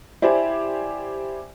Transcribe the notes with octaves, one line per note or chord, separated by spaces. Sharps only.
E4 G4 C5 D5 G#5